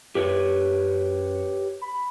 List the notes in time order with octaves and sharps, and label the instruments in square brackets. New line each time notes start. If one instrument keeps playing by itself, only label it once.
[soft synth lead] F#2 [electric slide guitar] G4 B4 C#5
[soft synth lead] B5